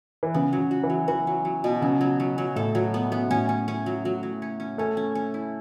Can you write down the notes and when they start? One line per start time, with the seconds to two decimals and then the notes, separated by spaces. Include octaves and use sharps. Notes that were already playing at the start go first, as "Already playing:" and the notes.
0.23 E3
0.34 C#3 B3
0.53 F#3
0.58 C#3
0.71 F#4
0.83 E3
0.90 F#3
1.08 E3 F#4
1.27 F#3
1.45 F#3
1.64 B2
1.82 C#3 F#3
2.01 F#3
2.20 F#3
2.38 F#3
2.56 A2 A4
2.75 F#3
2.94 B3
3.12 B3
3.30 A2 C#4
3.49 C#4
3.68 C#4
3.86 F#3
4.05 F#3
4.23 F#3
4.42 C#4
4.60 C#4
4.78 A3 C#4
4.97 C#4
5.15 C#4
5.34 E4